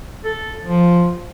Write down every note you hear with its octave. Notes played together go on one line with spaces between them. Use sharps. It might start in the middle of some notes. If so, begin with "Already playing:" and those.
A4
F3